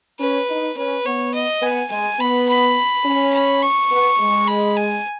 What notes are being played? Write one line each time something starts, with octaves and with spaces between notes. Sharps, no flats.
C#4 B4
D#4
C#4 B4
B3 C#5
D#5
B3 G#5
G#3 G#5
B3 B5
B5
C#4
B5
C#6
B3
G#3
B5
G#5